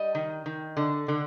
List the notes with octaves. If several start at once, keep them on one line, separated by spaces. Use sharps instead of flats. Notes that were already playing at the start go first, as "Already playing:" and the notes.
Already playing: G3 D#5
D#3
D#3
D3
D3